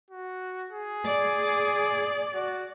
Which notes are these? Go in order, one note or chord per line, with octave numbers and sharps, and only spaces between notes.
F#4
G#4
D5
F#4